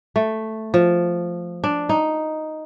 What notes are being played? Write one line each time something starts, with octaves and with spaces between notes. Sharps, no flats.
A3
F3
D4
D#4